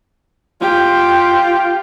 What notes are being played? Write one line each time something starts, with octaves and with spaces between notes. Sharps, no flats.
F4 G4